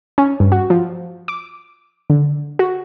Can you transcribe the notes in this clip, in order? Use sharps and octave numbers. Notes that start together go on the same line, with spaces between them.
C#4
G2
F#4
F3
D6
D3
F#4